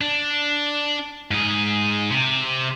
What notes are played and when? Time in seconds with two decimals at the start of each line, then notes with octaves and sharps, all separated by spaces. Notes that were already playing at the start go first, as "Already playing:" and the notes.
0.01 D4
1.31 G#2 G#4
2.10 C3